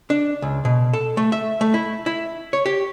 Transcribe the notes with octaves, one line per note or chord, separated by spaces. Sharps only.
D4
C#2
B2
A4
A3
E5
A3
E4
E4
C#5
G4